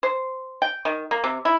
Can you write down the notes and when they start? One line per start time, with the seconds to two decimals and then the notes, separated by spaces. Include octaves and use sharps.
0.03 C5
0.62 G5
0.85 D#3
1.11 A#3
1.24 C3
1.45 E4